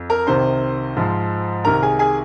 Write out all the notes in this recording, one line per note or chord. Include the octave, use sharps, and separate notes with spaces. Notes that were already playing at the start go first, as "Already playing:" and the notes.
Already playing: F2
A#4 A#5
C2 C3 D#3 C5 C6
G#2 F3
C2 C3 D#3 A#4 A#5
G#4 G#5
G#4 G#5